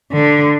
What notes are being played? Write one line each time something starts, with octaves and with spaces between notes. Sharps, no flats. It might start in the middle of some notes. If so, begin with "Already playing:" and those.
D3